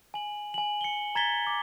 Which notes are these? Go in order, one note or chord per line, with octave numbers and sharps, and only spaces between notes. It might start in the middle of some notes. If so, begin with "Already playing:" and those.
G#5 F#7
G#5 F#7
C#7 G7
A#5 G#6 A6 B6 G7
D6